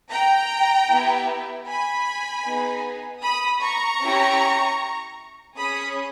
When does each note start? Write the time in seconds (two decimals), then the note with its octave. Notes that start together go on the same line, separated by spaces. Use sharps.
0.11 G5 A#5
0.89 B3 E4 G4
1.67 G#5 B5
2.45 B3 D#4 G#4
3.23 B5 D#6
3.61 A#5 C#6
4.01 C#4 E4 G4
5.56 C#4 G#4 B5 D#6